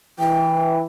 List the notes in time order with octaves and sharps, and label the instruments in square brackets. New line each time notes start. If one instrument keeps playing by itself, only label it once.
[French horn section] E3 [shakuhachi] G5